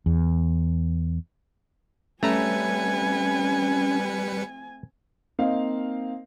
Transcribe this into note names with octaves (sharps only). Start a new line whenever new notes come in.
E2
G3 A3 C4 C#4 B4 G#5 A#5 C#7
A#3 C4 D#4 F5